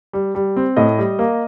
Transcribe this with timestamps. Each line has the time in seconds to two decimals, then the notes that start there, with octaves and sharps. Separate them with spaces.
0.13 G3
0.35 G3
0.56 C4
0.77 A2 D#5
0.98 G3
1.19 A#3